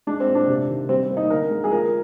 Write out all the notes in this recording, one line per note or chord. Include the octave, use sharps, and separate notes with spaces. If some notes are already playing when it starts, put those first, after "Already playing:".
G#3 D4
C4
A#2
D4
C3
D#3
G3 C4
A#3
D#4
D3 A#4
G#3
G#4
F3 A#4